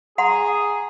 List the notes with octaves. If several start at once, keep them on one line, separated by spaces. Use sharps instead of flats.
G#4 F#5 A#5 C6